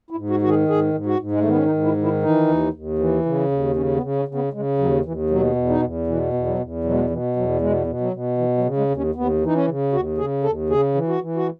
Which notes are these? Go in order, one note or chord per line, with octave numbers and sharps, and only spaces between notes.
E4
G#2
F#4
D#3 F#4
G#4
G#2 G#4
G#2
F#4
G#2
G#3
A3
D#3 B3
C#4
D#4
G#2
E4
D#3
E4
E3 D#4
D#2
D#2
E3
C#3
D#2
C#3 C#4
B3
C#3
C#4
C#3
B3
C#3 G#3
D#2 F#3
D#2 E3
B2 F#3
E2
D#4
E2
B2 E3
E2
F#3
E2
B2 F#3
G#3
F#3
B2 E3
E2 F#3
B2 G#3
B2
F#3
B2
E3
F#3
C#3
G#3
D#2
C#4
D#2 B3
E3
D#4
C#4
C#3
D#2 F#4
C#3 G#4
D#2 A4
C#3 G#4
E3
F#4
E3
F#4